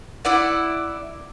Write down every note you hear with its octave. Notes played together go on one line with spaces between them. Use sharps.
E4 D5 F#5